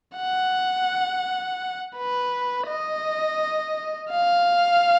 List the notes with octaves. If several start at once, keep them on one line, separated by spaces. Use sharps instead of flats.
F#5
B4
D#5
F5